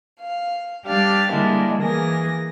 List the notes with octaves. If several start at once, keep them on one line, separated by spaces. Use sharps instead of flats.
F5
G3 D4 G4 F5 A6
D3 G3 G#3 A#3 D4 E4
E3 A#3 G#4 A#4 A#6